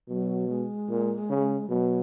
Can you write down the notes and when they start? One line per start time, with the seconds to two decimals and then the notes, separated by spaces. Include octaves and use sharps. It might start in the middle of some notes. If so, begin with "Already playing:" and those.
0.09 B2 F#3
0.49 G#3
0.89 A#2
1.30 C#3
1.69 B2 F#3